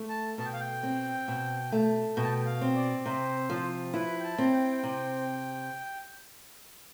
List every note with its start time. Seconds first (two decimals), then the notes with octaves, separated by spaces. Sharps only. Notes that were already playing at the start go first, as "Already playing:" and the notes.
Already playing: A3
0.09 A5
0.38 B2 A5
0.46 G5
0.53 F5
0.60 G5
0.83 C4
1.28 B2
1.72 A3
2.16 B2 G5
2.24 A5
2.31 G5
2.46 F5
2.61 C4
2.76 D5
3.05 C3 C5
3.50 F3
3.94 E4 B4
4.20 G5
4.24 A5
4.38 C4
4.53 G5
4.83 C3